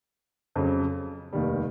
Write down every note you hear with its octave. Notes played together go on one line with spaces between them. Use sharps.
F2 C#3 F#3
F1 D#2 D#3 G3